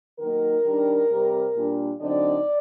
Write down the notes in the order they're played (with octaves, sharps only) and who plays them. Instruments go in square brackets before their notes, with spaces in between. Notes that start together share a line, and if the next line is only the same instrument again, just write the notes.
[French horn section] D#3 F#3 A#3 D#4 A#4
D#3 G3 D4
C3 G3 C4
A#2 G3 D4
D3 F#3 C4 D#4 D5